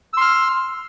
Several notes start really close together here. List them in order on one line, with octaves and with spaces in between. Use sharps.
E6 C6 F6